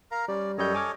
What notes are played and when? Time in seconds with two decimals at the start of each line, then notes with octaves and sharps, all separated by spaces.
0.11 A#4 F5 A#5
0.28 G3 C#4 D5
0.58 F#2 G3 A4 C#5 D#5 G6
0.75 G#5 D6 F6